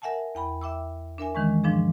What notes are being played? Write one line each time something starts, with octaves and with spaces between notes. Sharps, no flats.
A#4 E5 F#5 G#5 A5
E2 G5 B5
E5 G5 D6 E6
D4 A#4 E5 G#5
D#3 E3 G#3 C#4
G#2 F3 D4 G#4